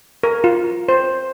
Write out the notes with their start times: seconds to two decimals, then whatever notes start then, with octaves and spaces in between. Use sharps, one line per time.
0.23 A#4
0.44 F4
0.89 C5